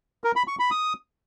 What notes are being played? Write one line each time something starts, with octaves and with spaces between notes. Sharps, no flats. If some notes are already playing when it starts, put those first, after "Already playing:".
A#4
B5
C#6
B5
D#6